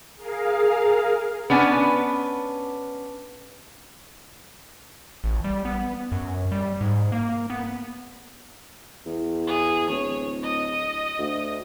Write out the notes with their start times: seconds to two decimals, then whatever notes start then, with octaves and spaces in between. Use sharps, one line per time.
0.16 G#4 A#4 F5
1.50 B3 C#4 D4 G#5
5.24 A1
5.44 G3
5.65 B3
6.12 F#2
6.52 G3
6.81 G#2
7.12 A#3
7.50 B3
9.06 E2
9.47 G#4
9.89 D1 C#5
10.43 D#5
11.19 D2